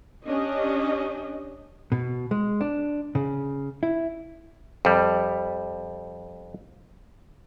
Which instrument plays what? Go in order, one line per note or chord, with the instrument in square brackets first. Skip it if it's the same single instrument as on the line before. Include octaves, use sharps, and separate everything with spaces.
[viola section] C#4 D4 G4 D#5
[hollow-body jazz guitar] B2
G#3
D4
C#3
E4
[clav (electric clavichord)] F2 G3